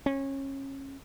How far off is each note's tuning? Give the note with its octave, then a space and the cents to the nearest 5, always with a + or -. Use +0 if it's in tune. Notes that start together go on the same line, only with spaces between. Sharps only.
C#4 -25